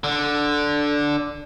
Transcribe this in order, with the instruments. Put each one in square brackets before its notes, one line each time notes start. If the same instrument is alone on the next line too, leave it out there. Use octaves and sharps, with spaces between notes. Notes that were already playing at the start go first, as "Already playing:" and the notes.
[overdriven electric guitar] D3